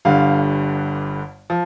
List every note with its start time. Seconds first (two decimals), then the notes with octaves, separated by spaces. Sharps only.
0.05 G1 G2 D3 F5
1.50 F3